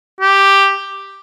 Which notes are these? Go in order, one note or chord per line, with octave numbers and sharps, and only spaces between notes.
G4